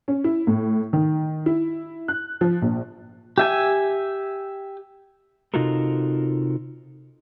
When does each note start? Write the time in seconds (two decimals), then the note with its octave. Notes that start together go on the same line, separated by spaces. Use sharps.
0.08 C#4
0.24 E4
0.47 A2
0.93 D#3
1.46 E4
2.08 F#6
2.41 F3
2.62 A#1
3.38 G4 E5 G#5
5.54 C3 D#4 F4 F#4 A4 A#4